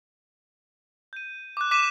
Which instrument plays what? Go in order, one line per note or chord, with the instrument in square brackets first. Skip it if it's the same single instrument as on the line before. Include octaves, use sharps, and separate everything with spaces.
[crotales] G6 D#7
D6 F#6
D6 B6 D#7 E7